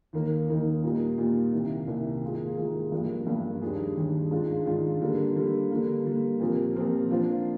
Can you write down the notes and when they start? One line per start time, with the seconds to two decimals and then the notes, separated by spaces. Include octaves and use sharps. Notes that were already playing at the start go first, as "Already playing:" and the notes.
0.13 D#2 D#3 A#3 D#4 A#4
0.48 D#2 D#3 A#3 D#4 A#4
0.83 A#2 G3 A#3 D#4
1.18 A#2 G3 A#3 D#4
1.53 C2 C3 D#3 A#3
1.87 C2 C3 D#3 A#3
2.23 G#2 D#3 A#3 F4 G#4
2.57 G#2 D#3 A#3 F4 G#4
2.92 G2 F3 A#3
3.27 G2 F3 A#3
3.62 D#2 D#3 G3 D4 G#4
3.96 D#2 D#3 G3 D4 G#4
4.31 G#2 D#3 G#3 D4 F4
4.66 G#2 D#3 G#3 D4 F4
5.01 D3 G3 A#3 D4
5.36 D3 G3 A#3 D4
5.71 D3 G3 A#3
6.05 D3 G3 A#3
6.40 A#2 F3 C4 G4 A#4
6.75 A#2 F3 C4 G4 A#4
7.10 F3 A#3 D4 F4 C5